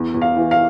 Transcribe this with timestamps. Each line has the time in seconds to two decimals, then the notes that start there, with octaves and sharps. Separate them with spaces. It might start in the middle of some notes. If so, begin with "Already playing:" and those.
Already playing: E2
0.14 E2
0.21 F5
0.36 E3
0.51 F5